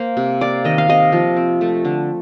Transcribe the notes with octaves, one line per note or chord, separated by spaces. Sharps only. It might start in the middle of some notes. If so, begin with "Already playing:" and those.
Already playing: A#3 C5
C3
A#3 D5
D#3 D#5
F5
C3 D#5
F3
C4
A3
D3